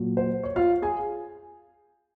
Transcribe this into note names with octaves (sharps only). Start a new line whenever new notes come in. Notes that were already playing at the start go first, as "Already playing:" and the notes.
Already playing: A#2 F#3
C5
C#5
F4 F5
G#4 G#5